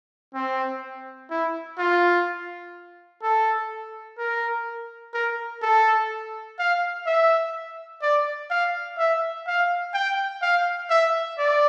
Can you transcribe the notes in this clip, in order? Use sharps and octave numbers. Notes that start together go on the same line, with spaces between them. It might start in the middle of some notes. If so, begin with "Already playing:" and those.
C4
E4
F4
A4
A#4
A#4
A4
F5
E5
D5
F5
E5
F5
G5
F5
E5
D5